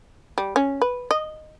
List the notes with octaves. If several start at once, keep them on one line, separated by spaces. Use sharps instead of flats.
G3
C#4
B4
D#5